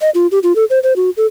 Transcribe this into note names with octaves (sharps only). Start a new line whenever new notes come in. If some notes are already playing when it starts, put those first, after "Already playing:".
D#5
F4
G4
F4
A4
C5
C5
F#4
A4